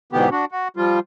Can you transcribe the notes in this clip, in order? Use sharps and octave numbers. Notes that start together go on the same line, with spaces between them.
G#2 B2 D3 E3 B3 G4
D4 F#4
F#4
F3 G3 F4